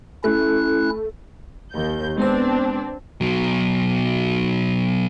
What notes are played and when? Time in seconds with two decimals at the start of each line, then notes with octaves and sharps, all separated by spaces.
0.24 A3 C#4 E4 F#6
1.73 D#2 G6
2.18 G#3 B3 C4 D4 B4
3.21 B2 F#3